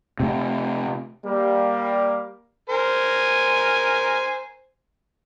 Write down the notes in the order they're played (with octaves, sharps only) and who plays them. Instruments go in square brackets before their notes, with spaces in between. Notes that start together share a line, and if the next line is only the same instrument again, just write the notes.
[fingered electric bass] C3 A3
[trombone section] G3 A#3
[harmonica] A#4 C5 G#5